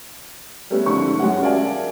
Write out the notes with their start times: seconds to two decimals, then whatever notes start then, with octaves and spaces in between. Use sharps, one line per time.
0.70 G3 A3 B3 C#4
0.86 G#2 D3 F3 C#6
1.19 F#2 F#3 G#3 C#4 G4 F#5
1.42 A#4 D5 E5 F5 G#5 A5